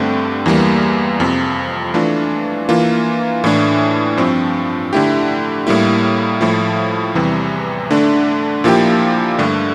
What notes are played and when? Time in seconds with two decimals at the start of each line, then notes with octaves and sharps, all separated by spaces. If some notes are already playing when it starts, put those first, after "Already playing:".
Already playing: G2 D3 A3 C4 G4
0.46 E2 E3 G3 A#3
1.20 F2 C3 F3
1.94 E3 A3 D4 F4
2.69 E3 A#3 F4
3.44 A2 E3 A3 D4
4.17 G2 F3 C4
4.93 D3 A3 E4 G4
5.67 A2 G3 A#3 E4
6.41 A2 F3 A3 E4
7.15 E2 C3 E3 G3
7.91 D3 A3 D4
8.64 A#2 F3 A#3 E4 G4
9.38 G2 D3 A3